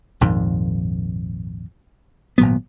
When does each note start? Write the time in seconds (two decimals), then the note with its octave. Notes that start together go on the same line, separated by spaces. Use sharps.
0.21 A#1 F2 G#2 D#3
2.38 G#1 A#2 F#3 B3